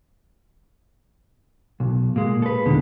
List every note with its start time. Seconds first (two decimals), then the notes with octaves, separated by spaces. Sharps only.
1.80 B1
2.16 A#2 G#3
2.42 A4 B4
2.65 E2 B2 D3 D#3 G#3